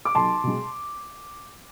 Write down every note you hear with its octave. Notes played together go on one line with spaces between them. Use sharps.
D6
B1 A5 C6
B2 G#3